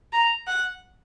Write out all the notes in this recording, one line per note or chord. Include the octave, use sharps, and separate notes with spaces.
A#5
F#5